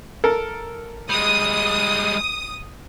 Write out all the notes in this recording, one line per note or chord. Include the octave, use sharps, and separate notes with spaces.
A4 A#4
G3 G#3 D#6